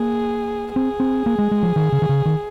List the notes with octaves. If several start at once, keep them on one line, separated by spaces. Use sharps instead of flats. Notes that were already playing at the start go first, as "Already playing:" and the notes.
Already playing: A#3 G#4
C4 G#4
C4
A#3
G#3
G#3
F3
D#3
C#3
D#3
C#3
D#3